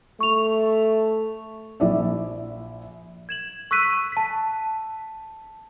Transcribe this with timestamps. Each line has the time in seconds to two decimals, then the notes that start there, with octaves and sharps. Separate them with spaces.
0.20 A3 C#6 F7
1.80 A#1 E4 D5 E5
3.29 G#6 E7 F#7
3.71 C#6 E6 F#6 B6 D#7
4.12 A5 B6